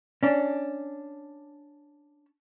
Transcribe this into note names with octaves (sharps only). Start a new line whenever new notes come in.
C#4 D4